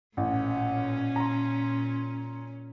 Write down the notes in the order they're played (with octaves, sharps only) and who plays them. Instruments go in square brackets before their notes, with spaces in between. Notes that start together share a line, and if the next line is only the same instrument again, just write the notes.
[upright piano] A1 [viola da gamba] A#2 C#4
[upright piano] A#5 C6